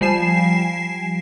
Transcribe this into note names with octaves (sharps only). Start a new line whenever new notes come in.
F3 G3 G#5 C7 E7